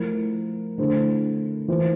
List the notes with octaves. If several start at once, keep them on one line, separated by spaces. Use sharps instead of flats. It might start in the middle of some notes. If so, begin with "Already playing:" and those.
Already playing: F3 A3 E4 A#4
D3 A3 E4 A4 C5
E3 A#3 F4 C5